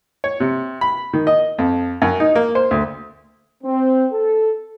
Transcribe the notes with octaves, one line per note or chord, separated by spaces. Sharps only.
C#5
C3
B5
D#3
D#5
F2
F#2
D#4
A#3
C5
D2
C4
A4